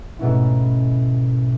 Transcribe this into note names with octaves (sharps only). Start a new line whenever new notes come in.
G#2 B2 A3 B3 C#4 E4